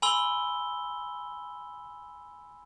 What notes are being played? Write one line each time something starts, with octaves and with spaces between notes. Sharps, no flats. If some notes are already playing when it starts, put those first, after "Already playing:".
G#5 B5 C6 E6 G7